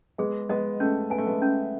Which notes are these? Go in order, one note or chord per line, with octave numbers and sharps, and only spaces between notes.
G#3 B3 G#4
G#3 B3 D#5
A3 C#4
B3 G#5
A3
G#3 B3
C#4